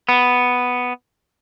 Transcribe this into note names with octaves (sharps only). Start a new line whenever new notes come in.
B3